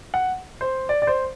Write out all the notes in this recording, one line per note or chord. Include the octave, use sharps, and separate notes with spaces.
F#5
C5
D5
D5
C5